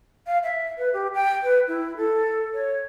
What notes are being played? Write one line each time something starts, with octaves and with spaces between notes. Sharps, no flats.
F5
E5
B4
G4
G5
B4
E4
A4
C#5